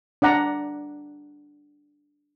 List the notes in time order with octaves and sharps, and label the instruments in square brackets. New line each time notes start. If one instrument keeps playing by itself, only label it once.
[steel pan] D4 D5 F#5 A#5